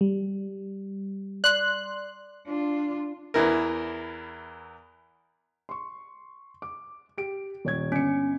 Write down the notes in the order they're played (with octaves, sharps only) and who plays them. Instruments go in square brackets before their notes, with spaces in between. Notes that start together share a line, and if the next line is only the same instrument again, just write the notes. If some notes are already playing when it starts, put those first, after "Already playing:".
[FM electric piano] G3
[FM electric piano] D5 C6 [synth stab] F#6
[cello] D4 F4
[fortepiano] E2 E3 A#4
[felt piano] C6 C#6
D6
G4 D7
D#1 C#5 G#6
[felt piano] G1 C#7 [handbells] C#4